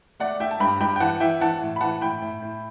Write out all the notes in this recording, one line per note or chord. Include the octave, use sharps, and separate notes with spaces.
A3 D5 F#5
A3 E5 G5
A5
G2 G5 B5
G2 G5 B5
G5
E3 F#5 A5
E3 E5 G5
E3 F#5 A5
A2
B5
E3 F#5 A5
A2 G5 B5
A2
A2